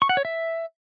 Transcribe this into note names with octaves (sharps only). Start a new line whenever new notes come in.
C#6
F#5
C#5
E5